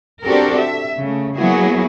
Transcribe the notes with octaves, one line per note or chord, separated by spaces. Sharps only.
C4 D4 F#4 G4 A4 A#4
E5
C#3 A3
F#3 A#3 B3 E4 F#4 G#4